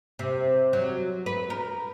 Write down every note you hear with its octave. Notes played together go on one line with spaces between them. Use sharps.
C3
F#3
B4
A#4